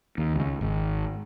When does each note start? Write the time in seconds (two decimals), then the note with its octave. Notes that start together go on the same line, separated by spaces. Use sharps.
0.18 D#2
0.36 C#2
0.61 G#1